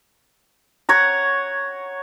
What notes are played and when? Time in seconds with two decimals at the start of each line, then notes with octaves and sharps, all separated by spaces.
0.89 C#5 F#5 A#5